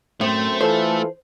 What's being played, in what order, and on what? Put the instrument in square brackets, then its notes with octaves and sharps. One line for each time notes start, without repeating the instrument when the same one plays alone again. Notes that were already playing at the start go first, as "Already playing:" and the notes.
[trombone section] F#2 C4 C5 [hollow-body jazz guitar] A2 [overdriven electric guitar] A3
[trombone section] E3 F4 A4 [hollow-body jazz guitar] C5